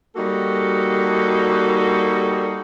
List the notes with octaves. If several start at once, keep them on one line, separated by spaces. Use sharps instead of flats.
G3 A#3 D#4 F#4 A4